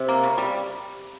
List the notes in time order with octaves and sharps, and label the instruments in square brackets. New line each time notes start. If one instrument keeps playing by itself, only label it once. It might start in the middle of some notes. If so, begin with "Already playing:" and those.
Already playing: [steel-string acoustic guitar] C3
[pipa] A#3
C#3
G3